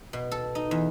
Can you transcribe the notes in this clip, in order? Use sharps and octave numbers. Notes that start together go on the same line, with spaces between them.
B2
A4
D#4
E2